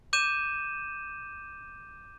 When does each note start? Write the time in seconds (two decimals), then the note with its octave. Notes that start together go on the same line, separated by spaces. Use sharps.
0.13 D6 G6 D#7 E7